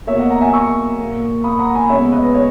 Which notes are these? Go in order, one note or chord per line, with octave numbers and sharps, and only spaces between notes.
B2 A#3 C#5 E5
D#5 F#5
F#5 A#5
E5 G#5
C#6 E6
A#2 A#3
B5 D#6
F#5 A#5
G#5 B5
C#3 G#3 B3 C#5 E5
B4 D#5
C#5